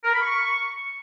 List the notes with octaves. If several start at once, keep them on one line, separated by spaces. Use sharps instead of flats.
A#4
B5
C#6